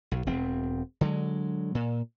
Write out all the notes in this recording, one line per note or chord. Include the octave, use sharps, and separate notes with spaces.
B1
E1 C4
D3 F#3 G#3
A#2